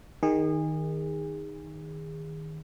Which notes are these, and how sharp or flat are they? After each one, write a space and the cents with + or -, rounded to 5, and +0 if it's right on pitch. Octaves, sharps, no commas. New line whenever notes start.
D#3 +0 G#4 -30